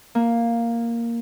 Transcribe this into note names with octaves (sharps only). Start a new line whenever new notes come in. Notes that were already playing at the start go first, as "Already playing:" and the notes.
A#3